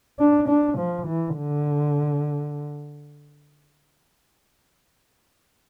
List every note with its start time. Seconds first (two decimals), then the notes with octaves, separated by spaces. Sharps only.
0.19 D4
0.48 D4
0.78 F3
1.07 E3
1.37 D3